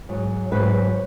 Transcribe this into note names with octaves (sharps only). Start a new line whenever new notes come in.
G#2 F#3
G#2 F#3 B4